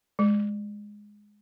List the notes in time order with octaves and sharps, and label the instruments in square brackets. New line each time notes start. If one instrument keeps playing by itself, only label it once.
[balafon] G#3